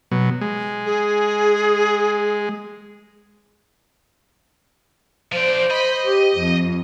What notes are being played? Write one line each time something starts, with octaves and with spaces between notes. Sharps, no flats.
B2 F#3
G#3
G#4
F3 C5 D5
D#5 B5
G4
F2